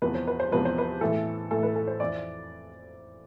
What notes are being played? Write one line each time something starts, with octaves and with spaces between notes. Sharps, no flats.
E2 C3 F3 B4
C5
B4
C5
E2 C3 F3 B4
C5
B4
A2 E3 A4
A2 E3 A4
B4
A4
C5
F2 E3 D5